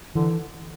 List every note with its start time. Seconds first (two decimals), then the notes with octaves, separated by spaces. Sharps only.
0.15 D3 E3